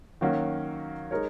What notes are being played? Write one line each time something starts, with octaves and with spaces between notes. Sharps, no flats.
D#3 F#3 A#3 C#4 F#4
G#3 D#4 A#4 C#5